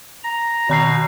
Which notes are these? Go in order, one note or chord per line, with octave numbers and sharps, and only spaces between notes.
A#5
B2 D#3 A#5 C7